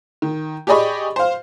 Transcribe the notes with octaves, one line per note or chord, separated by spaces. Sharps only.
D#3
G4 G#4 D5 D#5 B5 C#6
C5 F5